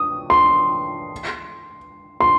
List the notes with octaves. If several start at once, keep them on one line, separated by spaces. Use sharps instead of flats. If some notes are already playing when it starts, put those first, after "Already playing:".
Already playing: D#6
C6
C6